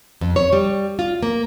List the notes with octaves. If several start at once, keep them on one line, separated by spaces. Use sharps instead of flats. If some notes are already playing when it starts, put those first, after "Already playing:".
F2
C#5
G3
F4
A#3